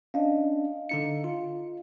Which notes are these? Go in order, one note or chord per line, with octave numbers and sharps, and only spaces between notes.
C#4 D4 D#5 F5
D3 D#4 C#7
F4